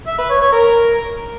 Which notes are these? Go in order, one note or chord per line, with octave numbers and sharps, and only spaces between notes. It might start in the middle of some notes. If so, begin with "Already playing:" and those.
E5
B4
C#5
C#5
A#4